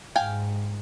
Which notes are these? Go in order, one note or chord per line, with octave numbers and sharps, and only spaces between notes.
G#2 F5 G5 G#5